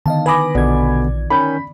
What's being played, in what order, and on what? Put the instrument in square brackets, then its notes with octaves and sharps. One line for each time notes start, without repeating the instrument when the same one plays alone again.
[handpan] D3 D#3 B3 [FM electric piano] D#5 F5 A5
[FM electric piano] B4 D#6 A#6 [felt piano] G#5 B5 D6
[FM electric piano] A#1 G#6 [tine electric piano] B2 D3 B3 [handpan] D5
[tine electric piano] D#3 C#4 G6 [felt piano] B5